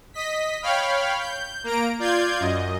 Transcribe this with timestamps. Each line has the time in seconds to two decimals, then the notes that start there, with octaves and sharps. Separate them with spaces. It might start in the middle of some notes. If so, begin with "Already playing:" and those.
0.14 D#5 B6
0.62 C#5 F5 G5 B5 F6
1.19 G6
1.64 A#3 A#5 D7
1.99 F4 D5 G6 G#6
2.40 F#2 D#5